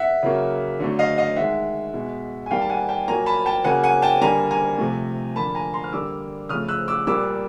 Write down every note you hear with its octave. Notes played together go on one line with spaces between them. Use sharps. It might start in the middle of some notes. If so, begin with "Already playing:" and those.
Already playing: E5 F#5
C#3 F#3 A#3
D3 F#3 A3
D#5 F5
D#5 F5
D#3 G#3 E5 F#5
B2 G#3
G#5
D#3 G3 A#3 F5 G5
A5
F#5 G#5
G5 A5
A#2 F#3 A#3 G#5 A#5
A5 B5
G5 A5
C#3 F#3 A#3 F#5 G#5
F#5 G#5
G5 A5
D3 G3 A#3 G#5 A#5
G#5 A#5
C3 F3 A3
D3 F3 A#3 A5 B5
G#5 A#5
A#5 C6
F6
D3 G3 A#3 D6 E6
C#3 F3 A3 D#6 F6
E6 F#6
D6 E6
A#2 G3 A#3 D6 E6